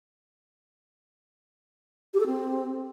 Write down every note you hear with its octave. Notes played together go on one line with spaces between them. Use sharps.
G4
A4
C4